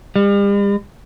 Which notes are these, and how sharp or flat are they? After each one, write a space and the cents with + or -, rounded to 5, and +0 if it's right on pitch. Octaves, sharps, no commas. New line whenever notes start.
G3 +45